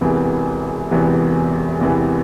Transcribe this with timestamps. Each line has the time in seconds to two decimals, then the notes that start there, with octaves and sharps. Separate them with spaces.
0.01 E1 E2 C3 E3 B3
0.91 E1 E2 C3 E3 B3
1.80 E1 E2 C3 E3 B3